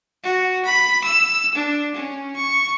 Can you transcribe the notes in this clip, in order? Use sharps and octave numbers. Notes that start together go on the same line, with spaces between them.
F#4
B5
E6
D4
C#4
C#6